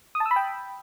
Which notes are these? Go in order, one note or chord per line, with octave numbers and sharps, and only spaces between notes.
D#6
A5
E6
B5
G5